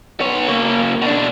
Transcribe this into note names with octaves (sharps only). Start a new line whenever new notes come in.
B3 C#5
C#3 A#3
B2 D4